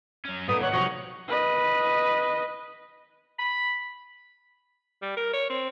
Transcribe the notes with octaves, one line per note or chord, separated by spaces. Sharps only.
F#3 C#4
A#2 A3 B3 D#4 D#6
D#3 C#5 F#5
C3 F3 F#3 D#4 C#6
B4 D#5
B5
G3
A#4
C#5
C4